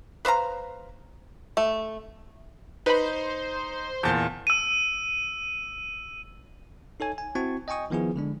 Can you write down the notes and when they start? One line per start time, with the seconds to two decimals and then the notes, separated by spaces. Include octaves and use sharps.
0.25 B4 C5 F5 A#5
1.57 A3
2.86 D#4 B4 C5 B5
4.03 E2 A#2 A5 G6
4.47 E6 D#7
7.00 D#4 A4 C#5 G#5
7.18 G#5
7.35 C4 E4 F#4 A5 C#6 G#6
7.68 D#5 G5 G#5 C#6 D#6
7.90 D#3 F3 B3 E4 G#4
8.16 D3 G#3 D4